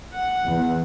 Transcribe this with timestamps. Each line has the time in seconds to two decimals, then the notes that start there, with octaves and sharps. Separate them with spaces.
0.12 F#5
0.46 E2